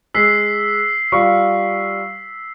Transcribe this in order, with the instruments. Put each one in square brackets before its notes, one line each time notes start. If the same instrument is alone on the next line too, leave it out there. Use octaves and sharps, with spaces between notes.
[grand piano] G#3 [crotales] E6 B6 C7
[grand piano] G3 F4 C#6